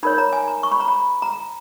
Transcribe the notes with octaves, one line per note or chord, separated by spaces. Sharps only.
D#4 A#4 C#5 B5
A#5
G#5
A#5
C#6
B5
A#5
B5
A#5